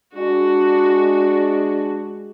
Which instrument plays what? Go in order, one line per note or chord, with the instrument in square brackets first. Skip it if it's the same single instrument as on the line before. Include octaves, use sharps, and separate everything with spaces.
[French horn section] G#3 D4 [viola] F#4